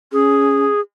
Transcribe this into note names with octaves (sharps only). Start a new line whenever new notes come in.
C#4 G#4